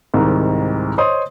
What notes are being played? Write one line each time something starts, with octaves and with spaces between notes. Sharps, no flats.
C2 G#2 D#3
C5 C#5 D#5 C6 D#6